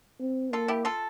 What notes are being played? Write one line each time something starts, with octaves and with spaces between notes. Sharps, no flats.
C4
A#3 F4 A4
E4 G4
F4 A4